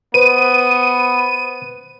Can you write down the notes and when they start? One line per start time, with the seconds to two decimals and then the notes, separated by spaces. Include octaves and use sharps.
0.14 B3 B4 C5 D#7